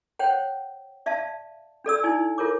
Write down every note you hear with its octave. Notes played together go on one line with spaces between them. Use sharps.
C5 C#5 F#5 G5
D5 E5 F5 A5
D4 A4 D5 E6
D#4 E4 D5 G#5
F4 A4 A#4 C#5 D6